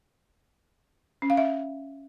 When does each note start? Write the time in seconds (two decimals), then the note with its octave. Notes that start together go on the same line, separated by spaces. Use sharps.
1.22 C#4
1.30 F5
1.37 E5